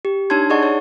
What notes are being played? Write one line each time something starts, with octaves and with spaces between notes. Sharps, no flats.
G4
D4 D#4 C#5 A5 C6 G#6
D#4 G#4 D5 D#5 F#5 C#6
C#5